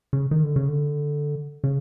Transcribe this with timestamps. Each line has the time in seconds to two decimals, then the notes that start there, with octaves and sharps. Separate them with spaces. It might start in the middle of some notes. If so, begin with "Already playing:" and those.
0.13 C#3
0.31 D#3
0.43 D3
0.56 C#3
0.68 D3
1.64 C#3